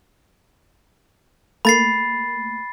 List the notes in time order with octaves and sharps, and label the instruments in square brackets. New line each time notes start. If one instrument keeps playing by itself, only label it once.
[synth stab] A3 A#3 [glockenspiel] B5 A6 C7